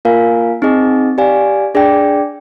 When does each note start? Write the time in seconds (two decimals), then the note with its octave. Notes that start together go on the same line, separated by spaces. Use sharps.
0.05 A#3 F4 A#4 F5 G#5
0.62 C4 D#4 G#4 D#5 G#5
1.18 G4 D5 F5 G#5
1.75 D4 G#4 D5 G5